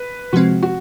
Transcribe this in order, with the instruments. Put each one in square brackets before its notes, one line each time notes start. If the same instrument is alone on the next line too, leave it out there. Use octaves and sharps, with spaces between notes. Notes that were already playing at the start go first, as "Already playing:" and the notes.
Already playing: [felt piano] B4
[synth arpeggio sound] C3 F3 G#3 C4 [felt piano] F#4
[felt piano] F#4